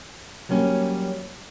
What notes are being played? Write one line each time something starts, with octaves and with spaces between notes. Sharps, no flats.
F#3 G3 A#3 C#4